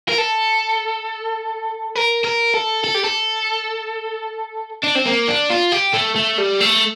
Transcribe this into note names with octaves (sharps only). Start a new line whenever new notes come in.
A#4
A4
A#4
A#4
A4
A4
G4
A4
D4
C4
A#3
D4
F4
G4
A3
A3
G3
A3